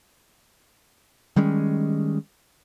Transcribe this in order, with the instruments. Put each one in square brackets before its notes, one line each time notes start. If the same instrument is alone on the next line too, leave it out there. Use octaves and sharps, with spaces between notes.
[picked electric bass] D#3 G3 G#3 C#4